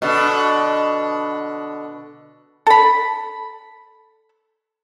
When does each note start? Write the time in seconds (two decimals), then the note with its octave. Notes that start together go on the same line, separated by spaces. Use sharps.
0.02 B2 D3
2.67 A4 B5